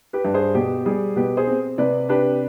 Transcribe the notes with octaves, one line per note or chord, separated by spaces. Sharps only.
G4 B4
G2
G#4 C5
B2 G4
G3 G#4
B2 G4 B4
G#4 C5
C4
C3 B4 D5
D4 G4 B4